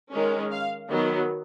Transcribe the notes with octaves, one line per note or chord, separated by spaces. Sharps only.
D#3 G#3 C#4
F5
D#3 F#3 B3